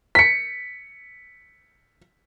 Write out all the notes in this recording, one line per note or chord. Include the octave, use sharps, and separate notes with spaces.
B6 C#7